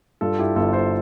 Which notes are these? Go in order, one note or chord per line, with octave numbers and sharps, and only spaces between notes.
G2 F4 A4
E4 G4
G1 F4 A4
A4 C5